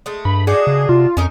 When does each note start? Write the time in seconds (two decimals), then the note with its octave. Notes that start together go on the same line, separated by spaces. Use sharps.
0.06 G#3 A3
0.25 G2 B5
0.47 D4 D#4 F#4 G#4
0.67 C#3
0.89 C3 F4
1.17 F2 C#4 D#4 A#4